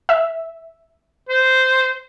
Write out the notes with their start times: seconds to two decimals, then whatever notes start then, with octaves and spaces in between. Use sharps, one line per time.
0.09 E5
1.29 C5